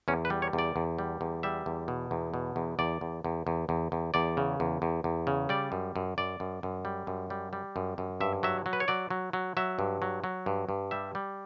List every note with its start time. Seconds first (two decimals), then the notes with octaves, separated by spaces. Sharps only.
0.08 E2 C#4
0.25 B4
0.30 G3
0.42 C#5
0.53 E2
0.59 D5
0.76 E2
0.99 G3
1.21 E2
1.43 G3 E5
1.66 E2
1.88 B2
2.11 E2
2.34 B2
2.56 E2
2.79 E2 D5
3.01 E2
3.25 E2
3.47 E2
3.69 E2
3.92 E2
4.14 E2 D5
4.37 C#3
4.60 E2
4.82 E2
5.04 E2
5.27 C#3
5.49 G3 D5
5.72 F#2
5.96 F#2
6.18 F#2 D5
6.40 F#2
6.63 F#2
6.85 G3
7.07 F#2
7.30 G3
7.53 G3
7.76 F#2
7.98 F#2
8.21 G2 E5
8.43 F#3 E5
8.66 F#3
8.73 B4
8.80 C#5
8.88 F#3 D5
9.10 F#3
9.33 F#3
9.57 F#3 E5
9.79 G2
10.02 F#3
10.24 F#3
10.46 G2
10.69 G2
10.91 G3 E5
11.15 G3